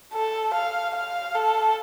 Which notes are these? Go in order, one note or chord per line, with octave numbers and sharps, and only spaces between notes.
A4
F5
F5
A4